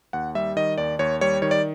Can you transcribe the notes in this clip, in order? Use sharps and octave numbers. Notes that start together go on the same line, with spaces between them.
D#2 F#5
G3 E5
D#3 D#5
D#2 D5
D#2 C#5
G3 C#5
D#3 C#5
D5